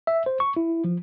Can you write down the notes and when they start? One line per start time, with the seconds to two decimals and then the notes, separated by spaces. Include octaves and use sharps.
0.07 E5
0.26 C5
0.40 C#6
0.57 E4
0.84 F3